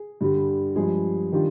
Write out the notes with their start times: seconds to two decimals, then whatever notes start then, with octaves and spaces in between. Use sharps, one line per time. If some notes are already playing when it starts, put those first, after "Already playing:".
Already playing: G#4
0.21 G2 D3 G3
0.76 G2 F3 G#3 G#4
1.32 D#3 G3 D4 F4